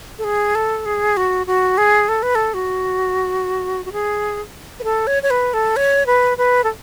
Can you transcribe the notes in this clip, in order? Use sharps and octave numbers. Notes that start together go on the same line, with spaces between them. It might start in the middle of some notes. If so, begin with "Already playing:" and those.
A4
G#4
A4
G#4
F#4
F#4
G#4
A4
B4
A4
F#4
F#4
G#4
B4
A4
C#5
C#5
B4
A4
C#5
B4
B4
A4